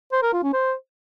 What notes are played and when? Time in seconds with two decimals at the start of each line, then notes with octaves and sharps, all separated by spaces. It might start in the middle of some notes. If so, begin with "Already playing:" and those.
0.12 C5
0.22 A#4
0.33 F4
0.43 C#4
0.53 C5